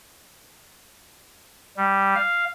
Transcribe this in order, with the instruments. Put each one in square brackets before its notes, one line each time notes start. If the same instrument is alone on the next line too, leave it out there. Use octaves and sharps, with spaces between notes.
[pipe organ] G3
F5